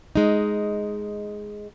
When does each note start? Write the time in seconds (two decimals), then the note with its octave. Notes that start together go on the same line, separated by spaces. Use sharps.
0.15 G#3 D#4